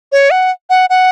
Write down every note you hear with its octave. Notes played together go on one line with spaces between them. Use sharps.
C#5
F#5
F#5
F#5